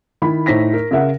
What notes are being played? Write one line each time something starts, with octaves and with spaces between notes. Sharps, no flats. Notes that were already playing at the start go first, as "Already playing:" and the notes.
D#3 E4 B5
A2 D#4 C5 A#6 B6
A#4
C#3 A#4 E5 F#5